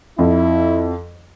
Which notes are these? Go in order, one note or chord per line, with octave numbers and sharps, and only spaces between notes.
F2 E4